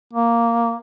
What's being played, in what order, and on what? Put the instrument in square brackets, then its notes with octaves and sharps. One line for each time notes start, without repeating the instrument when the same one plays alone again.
[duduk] A#3